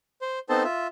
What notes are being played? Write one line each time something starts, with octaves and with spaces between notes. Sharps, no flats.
C5
B3 C4 D#4 A4 C5 A5
F4 E5